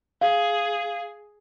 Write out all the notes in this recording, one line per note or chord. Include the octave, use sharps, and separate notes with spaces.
G#4 F5